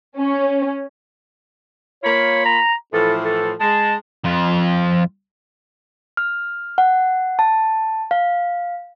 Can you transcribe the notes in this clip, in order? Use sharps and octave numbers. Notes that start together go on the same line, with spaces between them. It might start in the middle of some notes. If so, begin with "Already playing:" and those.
C#4
A#3 F4 C#5 B5
A#5
A2 E3 F3 A4
A4
G#3 A5
F2 F4
F6
F#5
A5
F5